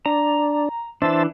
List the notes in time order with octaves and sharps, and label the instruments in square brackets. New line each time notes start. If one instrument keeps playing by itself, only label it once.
[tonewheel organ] D4 [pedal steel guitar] A#5
[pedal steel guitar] E3 D4 [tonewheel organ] C5 E5 A5